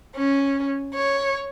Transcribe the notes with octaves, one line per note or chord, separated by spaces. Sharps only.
C#4
C#5